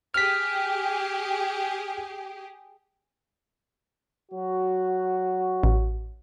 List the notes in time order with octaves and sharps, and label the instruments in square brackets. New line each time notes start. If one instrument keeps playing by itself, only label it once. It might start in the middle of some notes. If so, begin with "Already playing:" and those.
[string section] G4 G#4 [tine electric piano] F6 B6
[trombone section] F#3 F#4
[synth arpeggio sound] A1